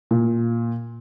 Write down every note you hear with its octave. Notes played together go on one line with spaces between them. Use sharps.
A#2